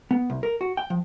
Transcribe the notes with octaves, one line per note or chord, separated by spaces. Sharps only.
B3
C2
A#4
F#4
G5
F3